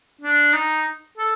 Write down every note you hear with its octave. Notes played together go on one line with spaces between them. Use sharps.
D4
D#4
A4